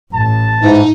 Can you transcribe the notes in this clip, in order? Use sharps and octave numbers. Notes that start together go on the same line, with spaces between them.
A1 A5
G#2 E3 D#4